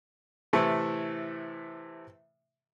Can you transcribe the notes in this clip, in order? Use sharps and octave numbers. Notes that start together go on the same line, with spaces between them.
A2 C3 E3 A3 E4